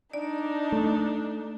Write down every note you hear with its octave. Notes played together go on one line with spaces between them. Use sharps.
D4 D#4 D5
A3